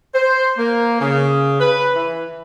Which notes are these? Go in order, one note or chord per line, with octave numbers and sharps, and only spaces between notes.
C5
A#3
C#3
B4
E3